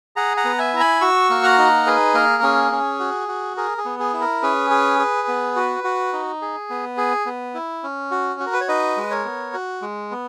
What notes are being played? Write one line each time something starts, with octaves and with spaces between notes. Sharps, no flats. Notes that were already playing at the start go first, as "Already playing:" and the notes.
G#4 F#5 A#5
F#5 A#5
B3
E5 G#5
E4 A#5
G#5 B5
F#4 C#6 E6
A#3
F#5 A#5
D#4
G#4 B4
A#3 A#4
C#4 G#4
C#4
F#4
F#4
G#4 A#4
G#4
B3
G#4
E4
A#4
C#4 G#4 B4
G#4
G#4
B3
F#4
F#4
D#4
G#4
B3
G#4
B3
E4
C#4
F#4
F#4
A#4
B4
C#5
D#4 B4 D#5
G#3
A#4 C#5
B3
F#4
G#3
B3